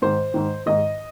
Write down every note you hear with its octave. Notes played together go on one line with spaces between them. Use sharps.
G#2 D#3 C5
G#2 D#3
G#2 D#3 D#5